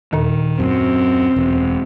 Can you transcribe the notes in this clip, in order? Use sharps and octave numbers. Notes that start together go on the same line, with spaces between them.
D#2 A#2 D#3
F#2 C4
E1